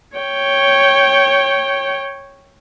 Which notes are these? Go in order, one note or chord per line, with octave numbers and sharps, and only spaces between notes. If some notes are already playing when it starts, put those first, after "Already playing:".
C#5 G5